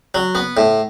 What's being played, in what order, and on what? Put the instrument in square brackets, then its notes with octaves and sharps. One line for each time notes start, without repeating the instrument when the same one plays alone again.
[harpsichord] F#3
B3
A2